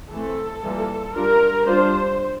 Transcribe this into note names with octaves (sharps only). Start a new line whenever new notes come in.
E3 A3 C4 A4
E3 G3 A#3 F4
G3 D4 F4 A#4
G3 D4 F4 C5